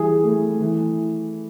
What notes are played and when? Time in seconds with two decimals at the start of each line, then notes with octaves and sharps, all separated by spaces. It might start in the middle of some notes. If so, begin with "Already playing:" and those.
Already playing: E3 G3 G#4
0.23 A3
0.61 E3